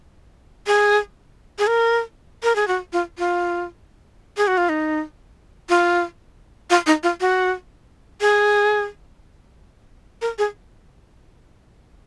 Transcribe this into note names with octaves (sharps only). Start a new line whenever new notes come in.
G#4
G#4
A#4
A#4
G#4
F#4
F4
F4
G#4
F#4
F4
D#4
F4
F4
D#4
F4
F#4
G#4
A#4
G#4